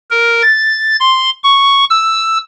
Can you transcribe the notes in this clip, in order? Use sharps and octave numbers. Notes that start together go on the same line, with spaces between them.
A#4
A6
C6
C#6
E6